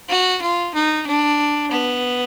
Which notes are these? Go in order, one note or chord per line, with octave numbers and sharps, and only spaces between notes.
F#4
F4
D#4
D4
B3